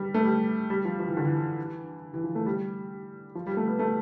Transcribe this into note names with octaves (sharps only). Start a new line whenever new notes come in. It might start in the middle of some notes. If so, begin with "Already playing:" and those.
Already playing: G3
A3
G3
G3
F3
F3
E3
D3
E3
E3
F3
A3
G3
F3
G3
A3
B3
A3